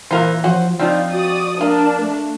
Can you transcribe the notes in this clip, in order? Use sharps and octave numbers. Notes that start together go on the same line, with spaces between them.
A#2 E3 F4 A#4 C5
F3 C#4 F#4 C5
F3 C4 D#4 F4 D5
F#4 D5 D#6
A#3 D4 A#4
A3